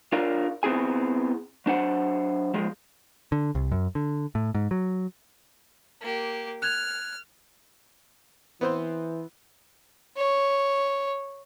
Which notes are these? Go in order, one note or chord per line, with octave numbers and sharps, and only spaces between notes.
D4 F4 A#4 C#5 D5 F5
B3 C4 E4 G#4 G#5
F#3 D4 C5 F#5
G#2 F3 G#3
D3
C2
F#2
D3
A2
G#2
F#3
A#3 G4
F6 F#6 G#6 F7
E3 B3 C4 C5
C#5